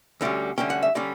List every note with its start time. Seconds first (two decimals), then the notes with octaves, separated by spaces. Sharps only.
0.21 D2 D3 G3 C#4
0.58 D2 D3 G3 C#4 G5
0.70 F#5
0.83 E5
0.95 D3 G3 C#4 D5